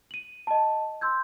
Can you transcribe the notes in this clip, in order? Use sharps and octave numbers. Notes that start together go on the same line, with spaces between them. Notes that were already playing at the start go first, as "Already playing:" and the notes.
D#7 F#7
D#5 A5
C6 E6 G6 G#6